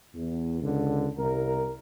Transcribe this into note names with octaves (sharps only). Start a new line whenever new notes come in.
E2
C#2 D3
C2 A#4